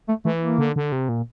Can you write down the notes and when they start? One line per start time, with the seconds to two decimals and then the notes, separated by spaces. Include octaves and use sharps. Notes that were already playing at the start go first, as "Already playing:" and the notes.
0.08 A3
0.25 E3 A3
0.42 A#3
0.59 D3
0.76 D3
0.92 C3
1.09 A#2